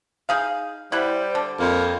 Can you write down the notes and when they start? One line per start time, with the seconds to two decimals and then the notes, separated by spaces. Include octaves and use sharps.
0.29 D#4 G#4 F5
0.92 G3 E4 C5 F#5 B5
1.35 D3
1.60 F2 A#3 B5